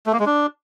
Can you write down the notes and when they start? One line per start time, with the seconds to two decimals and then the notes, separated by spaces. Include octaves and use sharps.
0.07 A3
0.13 A#3
0.20 G#3
0.26 D4